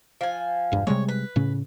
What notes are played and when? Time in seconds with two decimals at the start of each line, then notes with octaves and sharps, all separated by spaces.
0.21 F3 G#5
0.72 E1 G2
0.87 C3 G3 G#3 C#5
1.08 B4
1.36 A2 C#3 C#4